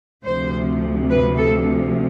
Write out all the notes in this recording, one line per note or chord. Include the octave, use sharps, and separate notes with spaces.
D2 C3 F3 C5
B4
A4